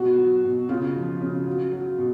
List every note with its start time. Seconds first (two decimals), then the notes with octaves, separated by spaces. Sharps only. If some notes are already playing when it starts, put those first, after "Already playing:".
Already playing: B2 F#4
0.18 F#3
0.45 B2
0.69 C#3 F4
0.96 F3
1.21 C#3
1.47 F#3
1.72 F#3
1.98 B2